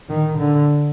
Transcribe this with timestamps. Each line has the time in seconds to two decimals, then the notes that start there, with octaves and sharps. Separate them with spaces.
0.10 D#3
0.38 D3